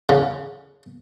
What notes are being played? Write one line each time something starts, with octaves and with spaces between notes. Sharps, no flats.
C#3